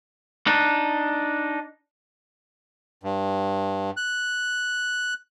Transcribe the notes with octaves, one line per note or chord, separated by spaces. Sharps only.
D4 D#4
G2
F#6